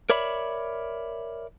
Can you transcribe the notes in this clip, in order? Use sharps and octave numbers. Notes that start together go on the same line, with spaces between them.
A#4 C#5 D5 E5 B5